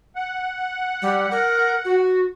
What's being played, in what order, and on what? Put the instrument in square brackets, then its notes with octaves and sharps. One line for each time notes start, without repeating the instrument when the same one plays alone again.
[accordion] F#5
[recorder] G3
A#4
F#4